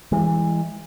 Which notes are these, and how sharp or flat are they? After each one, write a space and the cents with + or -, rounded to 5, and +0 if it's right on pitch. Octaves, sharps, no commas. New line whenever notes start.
E3 +0 G#3 -25